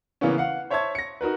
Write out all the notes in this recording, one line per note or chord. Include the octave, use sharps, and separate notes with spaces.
C#3 E3 A#3 B3 C#4
F5 F#5
C5 C#5 E5 A5 C#6 G#6
A#6 C#7
D#4 F#4 A#4 B4